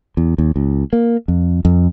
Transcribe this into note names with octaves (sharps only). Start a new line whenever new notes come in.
E2
D#2
C#2
A#3
F2
F2